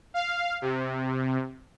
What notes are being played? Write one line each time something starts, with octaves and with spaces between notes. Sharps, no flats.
F5
C3